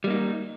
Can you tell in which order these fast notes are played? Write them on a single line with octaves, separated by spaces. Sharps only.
G3 A#3 D#4